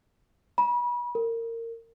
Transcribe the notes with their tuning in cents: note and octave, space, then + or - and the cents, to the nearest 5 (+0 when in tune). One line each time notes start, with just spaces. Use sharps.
B5 -35
A#4 -25